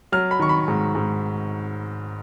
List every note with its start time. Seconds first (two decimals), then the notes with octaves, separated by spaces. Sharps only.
0.12 F#3 F6
0.31 B5
0.39 D#3 C#6
0.49 B5
0.68 G#2
0.95 G#2